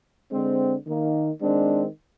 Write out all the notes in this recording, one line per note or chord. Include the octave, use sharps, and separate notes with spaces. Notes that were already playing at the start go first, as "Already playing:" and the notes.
D3 G#3 C4
D#3 A#3
D#3 G#3 C4 D4